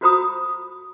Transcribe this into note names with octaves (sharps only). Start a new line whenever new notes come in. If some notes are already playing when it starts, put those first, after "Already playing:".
F4 F#4 C5 A#5 B5 D#6